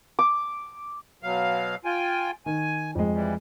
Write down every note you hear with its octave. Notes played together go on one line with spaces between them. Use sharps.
D6
B2 F#3 F5
F4 G5 G#5
D#3 G#5
F2 G#3
E3 G3